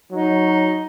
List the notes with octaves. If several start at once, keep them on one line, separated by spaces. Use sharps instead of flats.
F#3 D#4